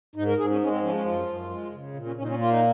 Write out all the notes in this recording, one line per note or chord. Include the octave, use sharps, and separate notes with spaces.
G#2 D#4
A#4
G#2 G#4
C#4
G#3 C#4
C4
F3 C#4
C#4
F#2 F4
F#2
G#3
C#3
A#2
C#4
A#2 C#4
D#4
C#4
A#3 F4
D#4